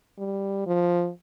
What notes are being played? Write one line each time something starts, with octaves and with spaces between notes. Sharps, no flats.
G3
F3